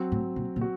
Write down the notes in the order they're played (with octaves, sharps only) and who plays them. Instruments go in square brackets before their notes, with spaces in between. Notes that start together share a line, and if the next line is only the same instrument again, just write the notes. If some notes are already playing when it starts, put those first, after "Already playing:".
Already playing: [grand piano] F#3 C4 F#4
[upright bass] A2
A#2
A#2
[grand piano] F#4